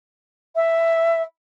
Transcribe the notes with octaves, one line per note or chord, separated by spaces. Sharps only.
E5